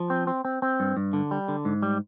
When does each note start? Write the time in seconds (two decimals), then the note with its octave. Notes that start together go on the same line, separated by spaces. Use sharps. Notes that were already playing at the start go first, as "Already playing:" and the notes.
Already playing: F3
0.10 C4
0.27 C4
0.45 C4
0.62 C4
0.80 G2
0.97 G2
1.13 D3
1.31 G3
1.48 D3
1.65 G#2
1.82 G3